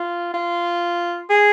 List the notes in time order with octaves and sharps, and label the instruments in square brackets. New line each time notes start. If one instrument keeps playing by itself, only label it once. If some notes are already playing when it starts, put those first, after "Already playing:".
Already playing: [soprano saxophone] F4
F4
G#4